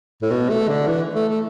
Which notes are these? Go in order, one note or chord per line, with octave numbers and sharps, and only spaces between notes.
A2
B2
A3
D3
E3
A3
A3